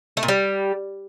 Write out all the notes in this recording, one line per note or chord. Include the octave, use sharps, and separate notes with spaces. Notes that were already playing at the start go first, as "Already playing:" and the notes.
A3
A#2
G3